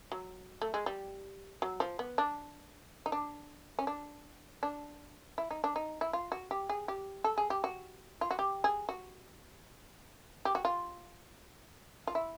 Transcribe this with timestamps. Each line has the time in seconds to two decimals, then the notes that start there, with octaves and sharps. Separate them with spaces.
0.12 F#3
0.62 A3
0.74 G#3
0.86 G3
1.62 F#3
1.80 F3
1.99 B3
2.18 D4
3.06 D#4
3.12 D4
3.79 C#4
3.87 D4
4.63 D4
5.38 E4
5.51 D#4
5.64 D4
5.76 D#4
6.01 E4
6.13 F4
6.32 F#4
6.51 G4
6.69 G#4
6.88 G4
7.24 A4
7.38 G#4
7.50 G4
7.64 F#4
8.21 F4
8.31 F#4
8.39 G4
8.64 G#4
8.89 F#4
10.45 G4
10.55 F#4
10.65 F4
12.07 F4
12.15 E4